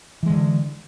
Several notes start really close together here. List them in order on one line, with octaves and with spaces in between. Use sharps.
E3 G#3 D3